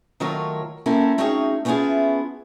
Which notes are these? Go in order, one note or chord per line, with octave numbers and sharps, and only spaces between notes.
D#3 F#3 A3 F4 A#4 C#5
A#3 C4 C#4 E4 A4 A#4
A3 C4 C#4 D#4 F#4 G#4
A3 B3 C#4 E4 F4 G#4